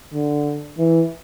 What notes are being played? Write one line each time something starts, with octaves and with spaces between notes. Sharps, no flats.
D3
E3